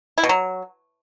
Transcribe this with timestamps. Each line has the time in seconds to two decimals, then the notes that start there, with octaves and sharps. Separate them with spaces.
0.18 E4
0.23 B2
0.29 F#3